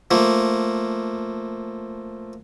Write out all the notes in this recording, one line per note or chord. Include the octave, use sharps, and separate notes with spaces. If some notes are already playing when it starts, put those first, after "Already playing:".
F3 A3 A#3